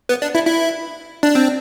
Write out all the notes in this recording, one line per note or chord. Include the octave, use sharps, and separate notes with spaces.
B3
D4
E4
E4
D4
C4